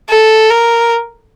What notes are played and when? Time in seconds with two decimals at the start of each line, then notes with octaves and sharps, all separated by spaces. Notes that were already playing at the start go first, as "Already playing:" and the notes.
0.10 A4
0.50 A#4